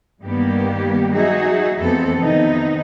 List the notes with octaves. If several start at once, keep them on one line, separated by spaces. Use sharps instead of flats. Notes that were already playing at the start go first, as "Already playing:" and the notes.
G2 D#3 G3 A#3 B3 G4
F#3 D#4 F#4 G#4 E5
F2 E3 A3 B3 C4 A4
C3 D#3 B3 D#4